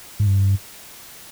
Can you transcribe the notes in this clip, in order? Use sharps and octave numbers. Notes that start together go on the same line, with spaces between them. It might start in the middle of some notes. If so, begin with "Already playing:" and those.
G#2
G2